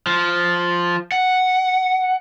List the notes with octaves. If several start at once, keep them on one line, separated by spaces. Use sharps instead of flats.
F3
F#5